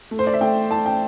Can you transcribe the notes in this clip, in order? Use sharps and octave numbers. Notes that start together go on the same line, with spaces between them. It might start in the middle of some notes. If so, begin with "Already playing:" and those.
A3
C5
D5
E5
A3 G5
A3 A5
G5